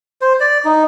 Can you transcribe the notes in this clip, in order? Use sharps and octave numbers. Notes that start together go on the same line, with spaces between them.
C5
D5
D#4